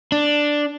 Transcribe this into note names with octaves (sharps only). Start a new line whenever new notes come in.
D4